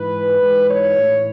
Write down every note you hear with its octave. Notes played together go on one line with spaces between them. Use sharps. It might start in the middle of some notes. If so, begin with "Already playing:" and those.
Already playing: G#2 E3 B4
G#2 E3
C#5
A2 E3